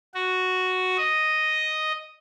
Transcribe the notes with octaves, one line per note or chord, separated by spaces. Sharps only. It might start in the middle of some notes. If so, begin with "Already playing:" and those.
F#4
D#5